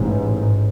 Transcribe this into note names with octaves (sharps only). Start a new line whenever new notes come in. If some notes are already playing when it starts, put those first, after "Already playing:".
Already playing: A1 G#2